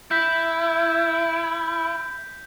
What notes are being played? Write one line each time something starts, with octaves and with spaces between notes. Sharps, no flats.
E4 G6 B6